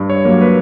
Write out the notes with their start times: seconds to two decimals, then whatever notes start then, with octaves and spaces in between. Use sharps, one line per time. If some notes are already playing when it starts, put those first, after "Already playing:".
Already playing: G2
0.10 C#5
0.25 F#3 A#3
0.41 B4